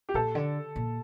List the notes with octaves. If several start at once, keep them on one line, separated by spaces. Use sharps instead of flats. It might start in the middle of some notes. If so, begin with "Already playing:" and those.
G4
A#2 A4
D3
A#2